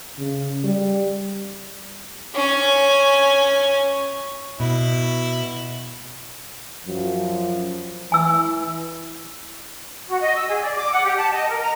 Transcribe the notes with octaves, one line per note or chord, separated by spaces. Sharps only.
C#3
G3
C#4 G#5
B2 E4
F#2 F3 F#3
E3 G#5 E6
F#4
D#5
E6
G#4
D5
D6
F#5
G4
A5
D#5
A#4
A#5